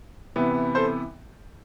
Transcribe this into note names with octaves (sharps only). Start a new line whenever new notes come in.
C3 E3 B3
A4 C5